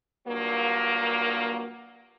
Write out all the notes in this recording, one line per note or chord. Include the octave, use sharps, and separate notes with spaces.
G2 A#2 F#3 A#3